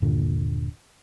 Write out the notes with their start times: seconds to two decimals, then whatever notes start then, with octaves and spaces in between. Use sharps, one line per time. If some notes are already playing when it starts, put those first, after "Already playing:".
0.02 D#1 G2 A#2 D3